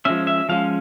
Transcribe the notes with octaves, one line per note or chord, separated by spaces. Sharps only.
F3 G#3 C#4 E5
E5
F3 G#3 C#4 F5